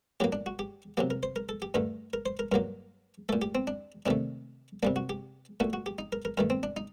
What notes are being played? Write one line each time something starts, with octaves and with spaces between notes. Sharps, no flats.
A2 F#3 A#3 G4
D4
F#4
G4
C3 F#3 A#3 G4
A#4
C5
A#4
A4
G4
G2 D3 A3 A#4
A#4
C5
A#4
G2 F#3 A#3 A#4
A#2 A3 A4
G4
C4
D4
C3 D#3 A3 D4
C3 G3 A#3 D4
F#4
G4
A#2 A3 F#4
F#4
G4
D#4
A#4
A#4
G2 D#3 A3 A#4
C4
D4
D#4